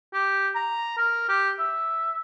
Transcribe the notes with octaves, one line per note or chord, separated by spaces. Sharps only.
G4
A#5
A#4
G4
E5